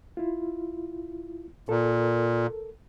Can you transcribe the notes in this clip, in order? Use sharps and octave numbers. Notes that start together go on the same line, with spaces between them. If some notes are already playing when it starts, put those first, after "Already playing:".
E4 F4
A#2 A4 A#4